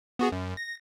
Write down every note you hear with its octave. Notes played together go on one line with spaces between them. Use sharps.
B3 F#4 G#4
F#2
A#6